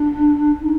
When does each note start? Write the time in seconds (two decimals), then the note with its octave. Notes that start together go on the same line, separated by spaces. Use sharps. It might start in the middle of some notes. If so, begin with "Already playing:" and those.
Already playing: D4
0.61 D#4